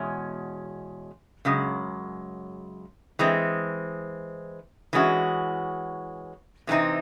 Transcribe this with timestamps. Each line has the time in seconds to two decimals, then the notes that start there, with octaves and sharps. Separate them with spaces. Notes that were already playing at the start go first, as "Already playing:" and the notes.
Already playing: E2 B2 G#3 C#4
1.45 F#2 C#3 G#3
3.19 E3 G#3 C4
4.93 E3 G#3 C#4 F#4
6.67 C3 E3 G#3 C4 D#4